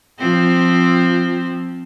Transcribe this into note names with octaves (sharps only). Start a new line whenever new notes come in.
F3 C4